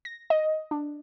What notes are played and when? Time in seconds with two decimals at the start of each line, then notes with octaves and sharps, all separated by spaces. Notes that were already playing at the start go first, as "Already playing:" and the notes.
0.05 A#6
0.30 D#5
0.71 D4